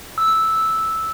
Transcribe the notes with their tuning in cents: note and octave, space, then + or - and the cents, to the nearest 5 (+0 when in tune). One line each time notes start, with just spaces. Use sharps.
E6 -5